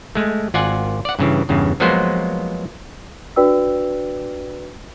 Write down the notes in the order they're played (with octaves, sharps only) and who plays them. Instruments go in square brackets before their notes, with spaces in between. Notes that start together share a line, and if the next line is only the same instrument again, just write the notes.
[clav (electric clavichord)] G#3 A3
G#1 F4 D5 F#5 G#5
D5 F#5
G2 C#3 E3
E2 G2 C#3
F3 F#3 G#3 A#3 B3 C5
[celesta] D4 F#4 B4 D5 G5 E6